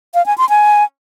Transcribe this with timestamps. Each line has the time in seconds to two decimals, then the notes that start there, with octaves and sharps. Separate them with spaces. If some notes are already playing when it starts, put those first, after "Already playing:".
0.15 F5
0.26 G#5
0.38 C6
0.49 G#5